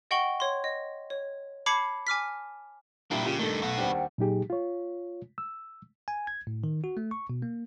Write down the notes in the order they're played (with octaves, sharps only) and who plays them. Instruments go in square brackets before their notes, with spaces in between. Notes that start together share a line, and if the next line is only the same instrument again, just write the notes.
[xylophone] D#5 F#5 G5 C#6 F#7 G7
C#5 C6
D#5
C#5
A5 B5 D6 G#6 C7 C#7
G#5 D6 F6 B6
[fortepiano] A#1 A#2 G3 [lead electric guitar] A#3 E4 [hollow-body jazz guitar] D4 G5
[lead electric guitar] C#3 [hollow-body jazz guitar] F4 G4 G5
[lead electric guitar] G2 D#3 [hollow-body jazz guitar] A3 A4
[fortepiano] B1 [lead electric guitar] B3 F#4
[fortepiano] D#2 G3 D4 [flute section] C5 F#5 G5
[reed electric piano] A#2 F#3 D#4 G4 G#4
F4 C#5
E6
[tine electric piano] G#5
G#6
A2
D#3
F#4
A3
C#6
B2
A#3